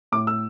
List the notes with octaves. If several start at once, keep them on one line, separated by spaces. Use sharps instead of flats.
A2 D6
E6